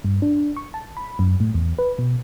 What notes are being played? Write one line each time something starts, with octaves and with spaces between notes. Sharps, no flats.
G2
D4
C#6
A5
B5
F#2
A2
E2
B4
B2